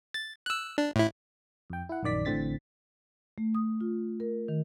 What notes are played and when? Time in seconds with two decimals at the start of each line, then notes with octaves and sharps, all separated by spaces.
0.14 A6
0.46 E6 F#6
0.78 D4
0.96 A2 E4
1.70 F2 G5
1.89 E4 F#5
2.03 A#1 F#2 D#3 D5 B6
2.25 A1 A2 D3 C4 A6 B6
3.38 A3
3.55 D#6
3.81 F4
4.20 A#4
4.48 D#3